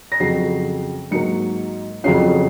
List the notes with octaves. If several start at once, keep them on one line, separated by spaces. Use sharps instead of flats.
A#6
F2 C#3 F#3 C7
G#2 F#3 A#3 C#7
F2 C#3 F#3 C#4 F4 C7